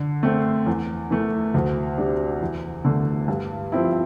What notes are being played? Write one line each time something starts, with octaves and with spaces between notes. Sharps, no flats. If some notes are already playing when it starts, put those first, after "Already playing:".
Already playing: D3
A3 C4
E2
E3 A3
D2
C3 G3 D4
E2
D3 A3
G2
F3 C4 E4